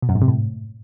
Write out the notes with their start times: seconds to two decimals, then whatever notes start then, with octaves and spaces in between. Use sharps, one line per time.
0.02 B2
0.09 F#2
0.15 G#2
0.22 C3
0.28 A2